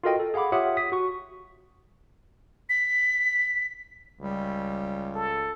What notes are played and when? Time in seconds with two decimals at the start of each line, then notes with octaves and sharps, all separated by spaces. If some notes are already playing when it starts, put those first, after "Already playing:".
0.04 F4 F#4 A4 A#4 D#5 G5
0.20 A4
0.34 G#4 F5 F#5 B5 D6
0.52 F4 G4 C#5 E5 F#5 D#6
0.77 D#6 B6
0.92 F#4 C#6
2.69 B6
4.21 C#2 G3
5.15 A4